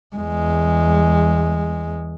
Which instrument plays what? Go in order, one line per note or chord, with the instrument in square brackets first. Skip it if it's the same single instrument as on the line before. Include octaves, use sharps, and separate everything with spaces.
[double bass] E2 G#3